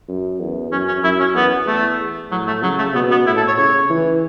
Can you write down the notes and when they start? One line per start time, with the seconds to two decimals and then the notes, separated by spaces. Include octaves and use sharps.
0.08 F#2
0.40 E2
0.71 F#2 C#4
0.88 C#4
1.04 F#2 E4
1.20 C#4
1.35 E2 B3
1.67 E2 A3
2.31 A2 F#3
2.47 A3
2.63 C#3 F#3
2.78 A3
2.95 B2 B3
3.11 B3
3.26 A2 E4
3.37 A4
3.47 C#5
3.58 C#3 C#5
3.89 E3